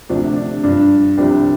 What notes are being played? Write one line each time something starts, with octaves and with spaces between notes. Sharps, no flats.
D2 C3 F3 D4
D4
G2 F3 D4
C2 C3 F3 D4 G4